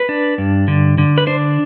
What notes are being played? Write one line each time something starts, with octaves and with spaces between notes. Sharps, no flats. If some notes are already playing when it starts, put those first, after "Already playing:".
Already playing: B4
D4
G2
D3
D3
B4
D4 C5